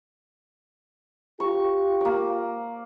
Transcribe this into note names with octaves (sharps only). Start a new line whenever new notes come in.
F4 G4 C#6
A#3 D5